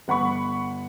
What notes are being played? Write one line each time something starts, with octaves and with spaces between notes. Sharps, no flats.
G1 F#5 B5 C#6